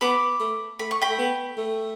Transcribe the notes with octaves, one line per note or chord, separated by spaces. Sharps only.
B3 B5 D6
A3
A3 B5
C#6
G5 B5
A3
B3
A3